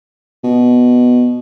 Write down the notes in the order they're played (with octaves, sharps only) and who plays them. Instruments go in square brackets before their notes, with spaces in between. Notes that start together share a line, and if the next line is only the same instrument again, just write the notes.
[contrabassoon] B2